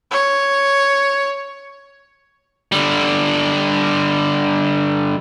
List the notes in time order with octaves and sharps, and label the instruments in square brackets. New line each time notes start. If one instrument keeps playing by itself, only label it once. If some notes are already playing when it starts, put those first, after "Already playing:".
[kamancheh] C#5
[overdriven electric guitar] D3 G3